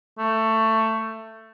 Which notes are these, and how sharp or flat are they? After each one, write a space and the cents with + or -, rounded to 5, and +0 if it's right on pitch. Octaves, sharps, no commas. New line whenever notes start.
A3 +15